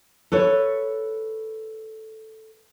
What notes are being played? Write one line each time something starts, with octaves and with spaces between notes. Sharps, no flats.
A4 B4 C#5